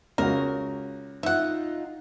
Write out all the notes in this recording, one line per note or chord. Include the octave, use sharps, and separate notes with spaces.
C#2 F#4 A#4
D#4 F4 E5 F#5